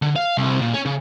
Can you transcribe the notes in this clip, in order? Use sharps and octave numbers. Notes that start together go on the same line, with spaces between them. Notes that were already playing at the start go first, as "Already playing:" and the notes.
D3
F5
C2
A#2
C#4
C#3